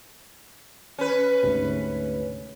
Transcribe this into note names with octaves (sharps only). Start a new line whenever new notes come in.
C#4 B4
D2 G#2 C3